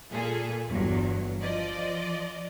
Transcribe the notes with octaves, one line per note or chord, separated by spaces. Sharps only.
A#2 G#4 A4
G1 E2 G2 F#3
F3 D5 D#5